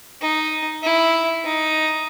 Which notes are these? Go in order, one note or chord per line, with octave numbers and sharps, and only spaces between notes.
D#4
E4
D#4